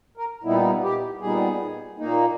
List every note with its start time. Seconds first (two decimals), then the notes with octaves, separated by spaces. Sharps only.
0.17 A#4
0.44 A#2 G3 B3 D#4 E4
0.82 G4
1.21 A#2 G3 B3 D#4 G#4
1.98 A#2 A#3 D#4